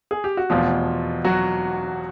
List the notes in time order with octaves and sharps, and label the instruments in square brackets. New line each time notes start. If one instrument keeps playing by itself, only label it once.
[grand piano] G#4
G4
F#4
F1 E2 B2 F3 F4
F#3 F#4